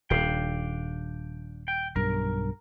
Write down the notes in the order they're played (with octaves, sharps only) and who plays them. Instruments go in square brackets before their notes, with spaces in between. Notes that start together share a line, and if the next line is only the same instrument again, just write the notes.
[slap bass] D#1 [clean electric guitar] D4 F5 G5
[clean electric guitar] G5
[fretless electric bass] B1 G2 [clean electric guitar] A#4